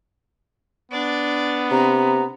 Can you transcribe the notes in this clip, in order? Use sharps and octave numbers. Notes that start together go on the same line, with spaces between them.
B3 D4 D5
C3 A#5